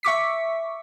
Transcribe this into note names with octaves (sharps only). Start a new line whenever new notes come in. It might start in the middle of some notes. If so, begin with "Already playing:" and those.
E5 C#6 D6 B6